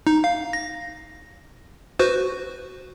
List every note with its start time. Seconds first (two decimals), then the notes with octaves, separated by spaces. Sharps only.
0.07 D#4
0.24 F5
0.53 A#6
1.99 F#4 B4 C5